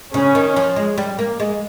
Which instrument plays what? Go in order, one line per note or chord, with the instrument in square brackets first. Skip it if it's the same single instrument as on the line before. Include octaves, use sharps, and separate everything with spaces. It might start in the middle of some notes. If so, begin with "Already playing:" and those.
[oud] C#3 [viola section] C#4
[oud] D#3
F3
G#3
G3
A#3
G#3